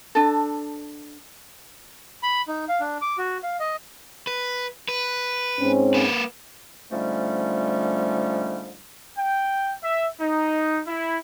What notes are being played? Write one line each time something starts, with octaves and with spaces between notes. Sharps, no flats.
D4 A4
B5
D#4
F5
D4
D6
F#4
F5
D#5
B4
B4
G#2 C4 C#4
A#3 B4
G#2 D3 F3 G3 A3 C#4
G5
E5
D#4
E4